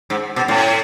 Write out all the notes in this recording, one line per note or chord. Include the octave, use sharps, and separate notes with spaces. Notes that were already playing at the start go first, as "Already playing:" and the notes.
G#2
B2
A2